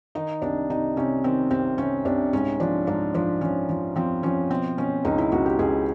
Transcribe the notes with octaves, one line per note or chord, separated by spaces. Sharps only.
D#3 D#4
C2 D4
C3 D#4
C3 C#4
D#3 C4
C2 C4
C3 C#4
C2 D4
G#2 C#4
F3 D4
G#2 D4
F3 D4
F3 C#4
F3
F3 C4
F3 C#4
B2 C4
B2 C#4
C#2 D#4
E4
C#2 F#4
G4
C#2 G#4